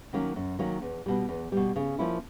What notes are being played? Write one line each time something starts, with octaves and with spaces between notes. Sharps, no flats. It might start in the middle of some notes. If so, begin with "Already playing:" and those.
D#3 F#3 A#3 C#4
F#2
D#3 F#3 A#3 C#4
E2
B2 G3
E2
B2 G3
C#3
F3 A#3 C#4 E4